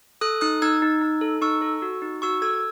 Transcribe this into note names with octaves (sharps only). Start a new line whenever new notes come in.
A4 D#6 F#6
D#4 D#6 F#6
D#4 E6 G#6
D#4
D#4
A4
D#4 C#6 E6
A4
F#4
D#4
F#4 C#6 E6
A4 E6 G#6